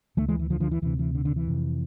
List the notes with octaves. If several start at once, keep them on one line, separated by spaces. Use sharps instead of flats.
D2 D3 F3 A3
E3 G#3
E3
D3 F3
D3 F3
E3
D2 C3 E3
E3
D3
D3
E3
F2 C3